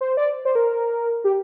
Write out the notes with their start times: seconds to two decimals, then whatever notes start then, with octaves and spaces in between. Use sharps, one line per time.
0.01 C5
0.17 D5
0.45 C5
0.55 A#4
1.24 G4